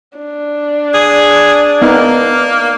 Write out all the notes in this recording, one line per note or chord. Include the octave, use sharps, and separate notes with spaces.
D4
G#4
A#3 B3 D#4